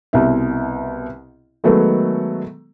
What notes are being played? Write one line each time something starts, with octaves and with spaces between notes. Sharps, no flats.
C2 B2 E5
D#3 F#3 G#3 A3 B3